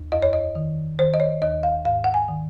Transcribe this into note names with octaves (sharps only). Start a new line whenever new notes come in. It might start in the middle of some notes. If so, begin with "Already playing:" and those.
Already playing: D#2
F2 D#5
C#5
D#5
D#3
D#3 C5
D#5
C#5
D#2 D#5
F5
G#2 F5
F#5
G#5
D#3